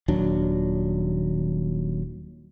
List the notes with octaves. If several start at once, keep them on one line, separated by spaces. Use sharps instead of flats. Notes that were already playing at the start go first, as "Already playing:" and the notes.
D#1 D#2 F#3 D4